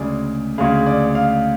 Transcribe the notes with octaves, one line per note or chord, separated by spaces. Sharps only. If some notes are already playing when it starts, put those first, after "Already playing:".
Already playing: D2 C#3 G#3 D5
D2 C#3 G#3 F5
D5
F5